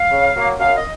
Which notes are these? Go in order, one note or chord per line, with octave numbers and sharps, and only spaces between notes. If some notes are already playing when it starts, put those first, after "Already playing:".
Already playing: F5
C#3
F#3 A#3
F#2 F5
D#5